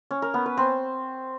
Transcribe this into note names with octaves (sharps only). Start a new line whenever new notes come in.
C#4
A#4
B3
B4
C4